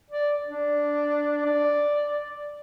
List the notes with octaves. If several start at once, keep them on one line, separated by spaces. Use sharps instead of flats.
D5
D4
D5